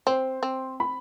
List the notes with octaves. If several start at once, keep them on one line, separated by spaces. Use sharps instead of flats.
C4 C5
C4
B5